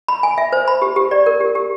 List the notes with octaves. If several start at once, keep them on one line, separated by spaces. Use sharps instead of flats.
B5
G#5
E5
C5
B5
G4
G4
D5
A#4
G4
G4